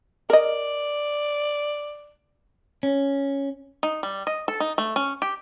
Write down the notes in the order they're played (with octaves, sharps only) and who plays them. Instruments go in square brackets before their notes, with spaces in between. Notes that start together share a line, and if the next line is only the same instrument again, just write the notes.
[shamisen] A#4 D#5 [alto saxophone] D5
[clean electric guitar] C#4
[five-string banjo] D#4
G3
D#5
A4
D#4
A3
C#4
G4